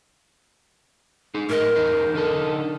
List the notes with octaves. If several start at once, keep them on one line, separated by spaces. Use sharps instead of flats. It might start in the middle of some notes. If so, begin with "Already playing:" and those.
D#4 G#4
A2 A#4 D#5
E2 D#4 C5
D3 D#4 A4